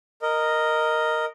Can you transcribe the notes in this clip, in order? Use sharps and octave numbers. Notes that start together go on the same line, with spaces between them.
A#4 D#5